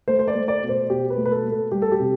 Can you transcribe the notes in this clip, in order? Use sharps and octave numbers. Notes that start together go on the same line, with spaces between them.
A3 C5
C5
D5
A3
D5
B2
C5
B2 G4
B4
A3
B4
A4
A3
A4
G3 G4
A4
G4
C3